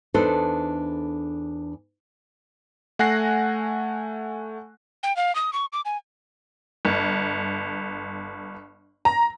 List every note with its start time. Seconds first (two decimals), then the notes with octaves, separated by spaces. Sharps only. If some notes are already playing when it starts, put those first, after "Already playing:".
0.14 E2 D4 D#4 A4 B4 C5
2.99 A3 F#5 G#5 F#6 A#6 C7
5.03 G5
5.16 F5
5.35 D#6
5.53 C#6
5.73 D6
5.85 G#5
6.85 G1
9.05 A#5